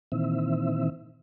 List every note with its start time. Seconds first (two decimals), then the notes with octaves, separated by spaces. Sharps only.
0.12 A#2 D#3 E3 C4 E5